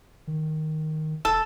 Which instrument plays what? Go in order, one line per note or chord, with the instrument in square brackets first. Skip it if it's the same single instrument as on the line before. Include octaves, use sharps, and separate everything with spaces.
[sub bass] D#3
[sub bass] F1 [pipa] A4